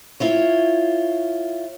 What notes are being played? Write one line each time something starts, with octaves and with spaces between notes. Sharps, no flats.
E4 F4 C#5